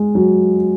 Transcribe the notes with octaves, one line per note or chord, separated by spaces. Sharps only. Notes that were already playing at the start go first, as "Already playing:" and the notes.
Already playing: G#3
F#3